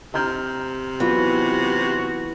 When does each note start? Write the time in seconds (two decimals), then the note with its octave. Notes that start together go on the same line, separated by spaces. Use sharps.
0.14 C3 A#5 F6 G6
1.00 E3 F#3 B3 F4 F#4